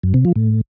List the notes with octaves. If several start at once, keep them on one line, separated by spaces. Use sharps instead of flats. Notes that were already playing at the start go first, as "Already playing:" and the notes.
F#2
C3
F3
A2